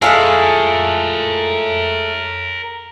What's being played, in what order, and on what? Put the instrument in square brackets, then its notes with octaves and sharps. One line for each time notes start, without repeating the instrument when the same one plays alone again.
[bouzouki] G#3 A3 E4 [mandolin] F4 G#4 [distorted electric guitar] A#4 C#5